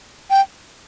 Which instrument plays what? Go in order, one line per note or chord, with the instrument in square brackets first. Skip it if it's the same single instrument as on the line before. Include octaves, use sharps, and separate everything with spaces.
[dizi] G5